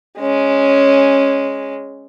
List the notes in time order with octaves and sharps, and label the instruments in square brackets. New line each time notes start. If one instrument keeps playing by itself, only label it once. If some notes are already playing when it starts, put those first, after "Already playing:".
[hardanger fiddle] G#3 C#4